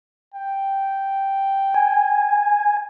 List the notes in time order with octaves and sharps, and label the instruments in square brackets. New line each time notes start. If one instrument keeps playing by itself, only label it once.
[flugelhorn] G5
[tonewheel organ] G#5